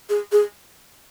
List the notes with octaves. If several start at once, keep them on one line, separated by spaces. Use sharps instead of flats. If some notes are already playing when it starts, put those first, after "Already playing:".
G#4
G#4